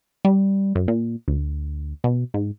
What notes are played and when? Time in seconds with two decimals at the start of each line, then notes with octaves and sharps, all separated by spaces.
0.25 G3
0.75 F#2
0.88 A#2
1.28 D2
2.04 B2
2.34 G#2